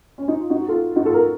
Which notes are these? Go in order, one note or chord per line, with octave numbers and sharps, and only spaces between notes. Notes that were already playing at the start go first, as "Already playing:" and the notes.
C#4
D#4
F4
D#4 F#4
F#4
F4 A4
D#4 F#4
F4 A4
F#4 A#4